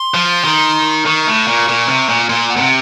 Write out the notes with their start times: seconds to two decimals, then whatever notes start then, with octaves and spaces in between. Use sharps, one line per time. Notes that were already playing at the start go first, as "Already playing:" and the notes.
Already playing: C6
0.14 F3
0.44 D#3
1.06 D#3 C#6
1.27 A2
1.47 A#2
1.68 A#2
1.88 C3
2.09 A#2
2.29 A#2 C6
2.50 F#5
2.57 A#2
2.61 C3